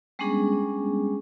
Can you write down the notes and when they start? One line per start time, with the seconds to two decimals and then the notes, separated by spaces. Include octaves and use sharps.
0.19 G3 G#3 B3 C#4 D4 G#4